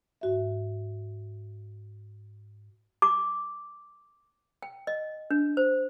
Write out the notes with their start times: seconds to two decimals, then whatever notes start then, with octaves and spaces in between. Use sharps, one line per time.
0.21 G#2 F#4 E5
3.02 D6
4.62 G5
4.87 D#5
5.31 D4
5.57 C5